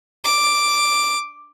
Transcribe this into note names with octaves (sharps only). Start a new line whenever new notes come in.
D6